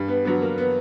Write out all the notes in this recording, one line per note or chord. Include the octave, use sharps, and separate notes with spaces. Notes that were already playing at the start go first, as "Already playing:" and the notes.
Already playing: G2
B3
D3 F#3 B3
A#3
B3